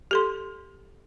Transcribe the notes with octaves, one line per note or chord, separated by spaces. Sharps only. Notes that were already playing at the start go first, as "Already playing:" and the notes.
G4 A4 C6